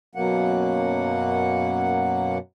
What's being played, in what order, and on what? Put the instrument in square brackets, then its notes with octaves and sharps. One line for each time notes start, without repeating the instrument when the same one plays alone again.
[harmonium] F#2 B2 F#3 A#3 F#5